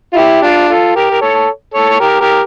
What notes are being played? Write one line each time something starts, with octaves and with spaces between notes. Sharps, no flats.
F4
E4 G4
D4 F4
F4 A4
G4 A#4
A#4
A4 C#5
A4 C#5
C#5
G4 A#4
G4 A#4